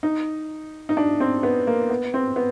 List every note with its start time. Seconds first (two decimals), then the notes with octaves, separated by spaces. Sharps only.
0.03 D#4
0.89 D#4
0.97 D4
1.20 C4
1.43 B3
1.67 A#3
1.90 B3
2.14 C4
2.36 B3